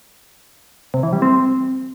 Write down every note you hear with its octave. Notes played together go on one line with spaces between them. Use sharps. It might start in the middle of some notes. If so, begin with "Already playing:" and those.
C3
E3
G3
C4